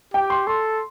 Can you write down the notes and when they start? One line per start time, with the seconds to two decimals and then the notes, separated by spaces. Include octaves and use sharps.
0.14 G4 G5
0.30 C6
0.47 A4 C6